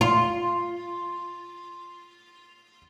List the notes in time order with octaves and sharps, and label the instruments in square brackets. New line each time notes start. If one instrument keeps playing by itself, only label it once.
[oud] F4 [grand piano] C6